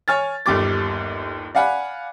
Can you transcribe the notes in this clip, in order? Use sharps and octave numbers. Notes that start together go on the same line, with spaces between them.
C#5 G#5 F6 A6
G1 D#2 G3 D6 A6
D5 F5 F#5 G#5 B5